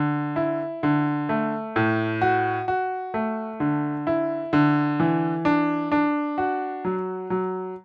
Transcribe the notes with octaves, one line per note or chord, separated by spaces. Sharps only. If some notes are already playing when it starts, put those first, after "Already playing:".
Already playing: D3
E4
D3
A3
A2
F#4
F#4
A3
D3
E4
D3
E3
D4
D4
F#4
F#3
F#3